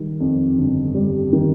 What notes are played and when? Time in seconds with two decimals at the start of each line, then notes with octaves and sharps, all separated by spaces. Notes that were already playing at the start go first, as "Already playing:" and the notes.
Already playing: D#3 G3
0.20 F2
0.58 G1
0.95 G3
1.33 D#3